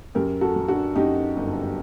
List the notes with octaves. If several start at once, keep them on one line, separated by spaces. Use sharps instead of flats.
F#2 G4 A#4
F#4 A4
F#3
D4 F#4
F#2 D#4 G4
G1